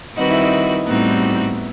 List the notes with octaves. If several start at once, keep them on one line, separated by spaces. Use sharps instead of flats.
D#3 G3 C4 D#4 F#4 B4
E4
D#4
A2 G3 B3 C4 D#4 F#4